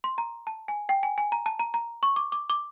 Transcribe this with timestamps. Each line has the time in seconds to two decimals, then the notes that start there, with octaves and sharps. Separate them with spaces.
0.04 C6
0.18 A#5
0.47 A5
0.68 G#5
0.89 G5
1.03 G#5
1.18 G#5
1.32 A#5
1.46 A5
1.59 A#5
1.74 A#5
2.03 C#6
2.16 D6
2.32 D6
2.50 D6